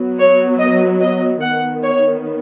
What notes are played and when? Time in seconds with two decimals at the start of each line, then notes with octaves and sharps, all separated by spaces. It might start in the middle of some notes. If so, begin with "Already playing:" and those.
Already playing: F#3 B3
0.19 C#5
0.59 D#5
1.01 D#5
1.42 D#3 B3 F#5
1.83 C#5